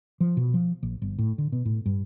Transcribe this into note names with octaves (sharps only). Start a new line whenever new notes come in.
F3
B2
F3
A#1
G1
A2
D3
B2
A2
G2